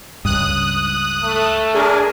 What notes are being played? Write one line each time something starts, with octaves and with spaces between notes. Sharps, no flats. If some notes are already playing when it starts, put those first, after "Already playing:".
C#2 G2 D#6 F#6
A3
D4 G#4 A#4 G#5